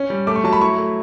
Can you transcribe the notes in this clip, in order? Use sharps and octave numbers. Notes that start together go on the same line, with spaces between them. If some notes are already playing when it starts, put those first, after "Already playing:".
Already playing: C#4
G3
A3 D6
C#6
F#3 A5
B5
E4 C#6
A3